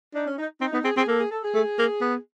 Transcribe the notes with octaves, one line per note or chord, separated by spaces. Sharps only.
D4 D#4
C#4
D#4
C4 D#4
B3 D#4
C4 G#4
C4 G#4
A#3 A4
G#4
A4
G#4
A3
A#3
B3